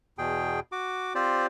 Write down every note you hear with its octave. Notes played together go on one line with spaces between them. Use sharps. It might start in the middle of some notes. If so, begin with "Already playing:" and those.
E2 B2 G#4 G5
F#4 D6
C4 F4 G4 C5 D5